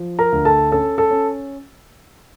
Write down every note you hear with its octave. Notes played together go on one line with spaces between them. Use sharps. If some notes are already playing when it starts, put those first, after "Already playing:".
Already playing: F3
A#4 A#5
D2
A4 A5
C#4 A4 A5
A4 A5
C#4